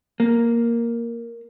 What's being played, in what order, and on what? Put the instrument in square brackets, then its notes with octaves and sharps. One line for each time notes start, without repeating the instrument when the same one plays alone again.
[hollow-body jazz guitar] A#3